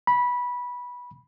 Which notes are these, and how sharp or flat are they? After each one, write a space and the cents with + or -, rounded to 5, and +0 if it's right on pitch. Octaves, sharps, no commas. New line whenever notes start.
B5 -15